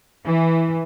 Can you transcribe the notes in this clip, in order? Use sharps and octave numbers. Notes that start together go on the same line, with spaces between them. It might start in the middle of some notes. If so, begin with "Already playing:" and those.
E3